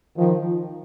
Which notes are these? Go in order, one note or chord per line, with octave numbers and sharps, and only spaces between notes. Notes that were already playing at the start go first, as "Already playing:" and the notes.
D#3 F3